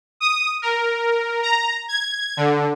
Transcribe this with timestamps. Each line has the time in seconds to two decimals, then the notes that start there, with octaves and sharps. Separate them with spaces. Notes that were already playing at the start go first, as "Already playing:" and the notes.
0.20 D#6
0.62 A#4
1.43 A#5
1.88 G#6
2.37 D3